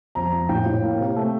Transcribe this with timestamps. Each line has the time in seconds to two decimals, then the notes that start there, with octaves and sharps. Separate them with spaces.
0.15 F2 A#5
0.32 F2
0.49 A2 G5
0.66 A2
0.82 A#3
0.99 C3
1.16 A3